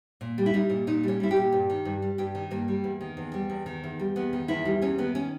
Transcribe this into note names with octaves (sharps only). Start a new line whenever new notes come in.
A#2
G3
E4
G3 D#4
A#2
A#2 D#4
G3 C#4
G3 E4
G4
A#2
G2
D#3
G2
G3
G2 G4
D#3
G2 A#3
G3
E2
D#3
E2
G3
E2
D#3
E2
G3
E2 B3
D#3
E2 E4
G3
E2 C#4
D#3 B3
C#4